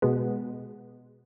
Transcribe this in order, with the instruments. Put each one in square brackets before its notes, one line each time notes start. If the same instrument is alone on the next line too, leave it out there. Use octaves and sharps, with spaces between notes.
[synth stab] B2 G#3 B3